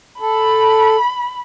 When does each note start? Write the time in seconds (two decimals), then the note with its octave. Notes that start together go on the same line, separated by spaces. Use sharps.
0.20 A4 B5